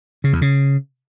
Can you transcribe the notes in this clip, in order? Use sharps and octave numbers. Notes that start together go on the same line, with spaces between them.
C#3
E2
C#3